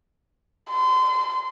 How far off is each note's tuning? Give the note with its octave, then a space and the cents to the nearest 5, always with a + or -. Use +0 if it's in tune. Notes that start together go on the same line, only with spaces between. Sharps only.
C6 -30